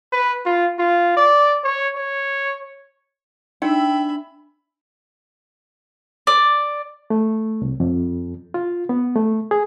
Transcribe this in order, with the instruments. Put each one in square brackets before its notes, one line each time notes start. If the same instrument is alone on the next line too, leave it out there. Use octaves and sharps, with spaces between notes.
[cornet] B4
F4
F4
D5
C#5
C#5
[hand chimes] D4 [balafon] D#4 [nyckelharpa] E5 B5 [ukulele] G5
[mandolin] D5
[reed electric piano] A3
C2
F2
F4
B3
A3
G#4